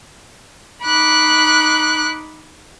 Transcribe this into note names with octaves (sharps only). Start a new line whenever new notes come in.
D#4 B5 D6 F#6